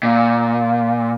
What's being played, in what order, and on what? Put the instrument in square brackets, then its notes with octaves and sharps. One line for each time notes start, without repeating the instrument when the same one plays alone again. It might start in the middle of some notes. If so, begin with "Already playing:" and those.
[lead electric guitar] A#2